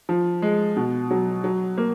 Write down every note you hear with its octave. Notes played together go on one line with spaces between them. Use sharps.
F3
G#3
B2
F#3
F#3
A#3